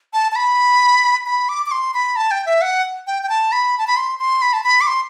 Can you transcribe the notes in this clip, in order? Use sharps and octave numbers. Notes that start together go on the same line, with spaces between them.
A5
A5
B5
B5
D6
D6
C6
B5
A5
G5
E5
F#5
G5
G5
A5
B5
A5
B5
C6
C6
B5
A5
B5
D6
C6